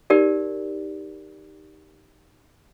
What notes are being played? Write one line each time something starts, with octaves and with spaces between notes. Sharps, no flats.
D#4 G4 A#4 D5